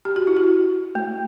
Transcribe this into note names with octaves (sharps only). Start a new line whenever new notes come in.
G4
F#4
E4
F#4
A3